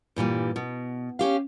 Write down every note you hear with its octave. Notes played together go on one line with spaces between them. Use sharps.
G2 A#2 E3 G3
B2
C#4 G4 F5